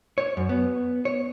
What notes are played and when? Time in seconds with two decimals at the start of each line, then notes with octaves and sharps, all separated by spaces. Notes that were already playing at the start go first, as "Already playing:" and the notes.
0.18 C#5
0.37 F#2
0.49 B3
1.05 C#5